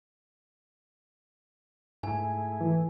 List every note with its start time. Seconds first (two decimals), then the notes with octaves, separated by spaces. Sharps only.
2.03 G#2 A3 E4 G#4 G#5
2.61 E3